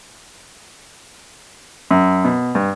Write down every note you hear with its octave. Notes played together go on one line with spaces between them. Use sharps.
F#2
B2
G2